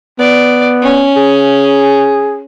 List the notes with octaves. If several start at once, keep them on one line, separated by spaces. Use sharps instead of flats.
B3 D5
C#4
G#4